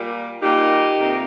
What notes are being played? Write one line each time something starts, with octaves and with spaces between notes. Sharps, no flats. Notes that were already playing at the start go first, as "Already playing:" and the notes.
Already playing: A#2 G3 A#3
A#2 G3 A#3 D#4 G4
F2 C3 D#3 A#3